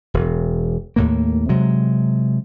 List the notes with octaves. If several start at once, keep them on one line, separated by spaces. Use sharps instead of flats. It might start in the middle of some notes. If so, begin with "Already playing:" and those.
E1
D#2 A2 A#3
C3 F#3 G#3